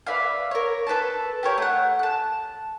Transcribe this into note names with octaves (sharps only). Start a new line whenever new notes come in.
B4 D5 E5 F5
A#4 C#5
A4 B4 C5 A5
G4 A#4 C#5
A3 F#5
A5 F#6